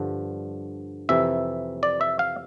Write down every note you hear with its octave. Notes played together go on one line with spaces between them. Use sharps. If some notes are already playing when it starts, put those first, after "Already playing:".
Already playing: G2 D3 F3
F2 C3 E3 E5
D5
E5
F5